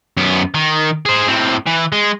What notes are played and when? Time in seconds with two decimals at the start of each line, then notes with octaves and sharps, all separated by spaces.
0.17 F#2 B3
0.54 D#3
1.06 G#4 C5
1.28 A2 C4
1.67 E3
1.92 G#3